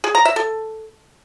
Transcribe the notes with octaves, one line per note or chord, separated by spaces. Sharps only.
G#4
A#5
E5
A4